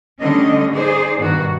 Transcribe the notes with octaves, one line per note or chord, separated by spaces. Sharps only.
D3 G3 A3 C#4 D#5
D#4 G#4 C5 D5
G2 B2 D#3 F#4